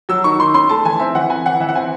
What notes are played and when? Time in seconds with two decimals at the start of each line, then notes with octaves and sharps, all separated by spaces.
0.09 F#3 E6
0.24 D#3 C#6
0.39 D#3 C6
0.54 C#4 C6
0.69 A3 A5
0.85 E3 G#5
1.00 C4 E5
1.15 E3 F#5
1.30 C4 G#5
1.45 E3 F#5
1.60 E3 E5
1.69 F#5
1.75 C4 G#5